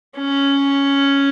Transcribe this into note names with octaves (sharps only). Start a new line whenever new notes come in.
C#4